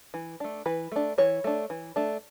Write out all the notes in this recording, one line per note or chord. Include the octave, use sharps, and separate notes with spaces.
E3
A3 D4
E3 B4
A3 D4
E3 C#5
A3 D4
E3
A3 D4